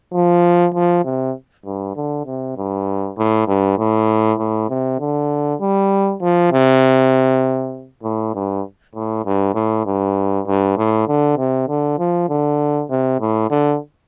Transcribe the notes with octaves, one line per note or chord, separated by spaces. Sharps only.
F3
F3
C3
G2
D3
C3
G2
A2
G2
A2
A2
C3
D3
G3
F3
C3
A2
G2
A2
G2
A2
G2
G2
A2
D3
C3
D3
F3
D3
C3
A2
D3